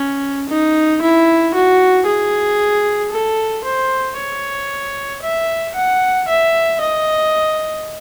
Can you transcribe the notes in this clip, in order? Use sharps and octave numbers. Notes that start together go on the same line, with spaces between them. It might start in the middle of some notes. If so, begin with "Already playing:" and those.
Already playing: C#4
D#4
E4
F#4
G#4
A4
C5
C#5
E5
F#5
E5
D#5